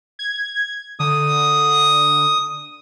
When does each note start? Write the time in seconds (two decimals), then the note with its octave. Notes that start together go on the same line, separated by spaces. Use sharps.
0.19 G#6
1.00 D3 D#6